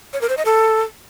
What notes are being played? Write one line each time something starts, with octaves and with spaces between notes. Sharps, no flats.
C#5
A#4
C5
D#5
A4